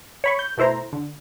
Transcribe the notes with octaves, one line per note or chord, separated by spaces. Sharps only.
C#5 B5 C#6
G6
B2 A3 E4 C5 A#5
D3